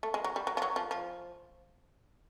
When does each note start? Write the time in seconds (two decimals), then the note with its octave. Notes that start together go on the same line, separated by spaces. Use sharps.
0.03 A3
0.14 G#3
0.24 F#3
0.36 G3
0.47 F#3
0.57 F3
0.62 F#3
0.76 F3
0.91 F3